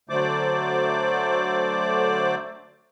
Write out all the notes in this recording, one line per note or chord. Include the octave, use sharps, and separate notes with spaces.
D3 F#3 A3 C5 D5 D6